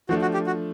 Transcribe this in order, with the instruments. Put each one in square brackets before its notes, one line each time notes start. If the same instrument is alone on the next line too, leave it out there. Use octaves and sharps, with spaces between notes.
[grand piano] F3 A3 D4 [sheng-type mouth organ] F#4
[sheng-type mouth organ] F#4
G4
F#4